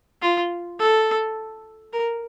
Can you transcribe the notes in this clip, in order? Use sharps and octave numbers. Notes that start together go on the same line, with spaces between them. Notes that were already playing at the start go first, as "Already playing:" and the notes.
F4
A4
A#4